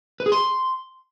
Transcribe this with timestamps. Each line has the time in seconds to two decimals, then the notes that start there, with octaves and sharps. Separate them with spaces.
0.20 B4
0.26 G#4
0.32 C6